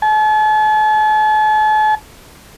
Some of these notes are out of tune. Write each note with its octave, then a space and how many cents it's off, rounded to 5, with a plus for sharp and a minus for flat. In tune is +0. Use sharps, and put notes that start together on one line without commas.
A5 -45